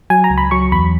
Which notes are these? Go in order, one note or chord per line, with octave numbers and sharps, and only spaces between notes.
F#3 G#5
A#5
C#2
B5
F#3 C#6
E2 B5